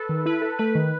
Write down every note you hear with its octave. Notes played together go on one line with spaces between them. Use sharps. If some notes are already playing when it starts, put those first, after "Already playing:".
Already playing: A4 B4
D#3
E4 B4
A4
A3 B4
D#3